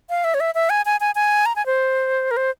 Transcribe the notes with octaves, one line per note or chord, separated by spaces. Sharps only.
F5
E5
C#5
E5
E5
G#5
G#5
G#5
G#5
A#5
G#5
C5
A#4
C5